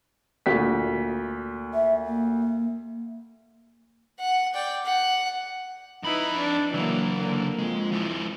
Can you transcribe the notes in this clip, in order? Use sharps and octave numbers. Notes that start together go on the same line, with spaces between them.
D2 A#2 B6
E5
A#3
F#5
D5 G5
F#5
F2 D#4 E4 B4 B5
D4
C#3 E3 F#3 A#3
D3 A#3
F2 G#3
F3 E4